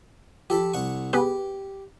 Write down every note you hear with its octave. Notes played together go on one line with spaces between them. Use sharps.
F3 G4 A4 B5
C2 F#5 C#6
B3 G4 G#4 B4